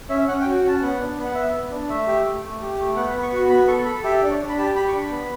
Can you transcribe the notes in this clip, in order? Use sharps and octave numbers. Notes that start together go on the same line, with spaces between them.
C#4 E5
C#4 F#5
G5
F#4
F#5
C#4 A5
B3 F#5
D4
B3
F#5
B3 E5
B3
D4
A3 E5
G4
A3
A3
G4
A3
B3 F#5
B5
B3
C#6
F#4 C#6
B3 B5
A4 C#6
A4 B5
G4 E5
D4 D5
C#5
D4
B5
G4 A5
G4 B5
C#6
D4 B5
B3